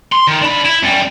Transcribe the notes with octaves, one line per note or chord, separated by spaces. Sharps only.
C6
D#3
D4 B5
E4
F#2 G3